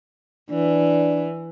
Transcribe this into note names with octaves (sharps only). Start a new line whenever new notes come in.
E3 D4